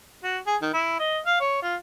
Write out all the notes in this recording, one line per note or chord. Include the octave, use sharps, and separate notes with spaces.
F#4
G#4
D#3
E4
D#5
F5
C#5
F4